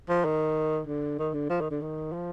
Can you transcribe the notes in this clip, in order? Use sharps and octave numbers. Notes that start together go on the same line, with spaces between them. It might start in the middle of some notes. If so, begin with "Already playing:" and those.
F3
D#3
D3
D#3
D3
F3
D#3
D3
D#3
F3